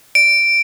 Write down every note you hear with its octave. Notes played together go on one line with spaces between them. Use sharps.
D7